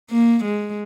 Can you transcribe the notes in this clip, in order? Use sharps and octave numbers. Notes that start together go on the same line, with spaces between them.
A#3
G#3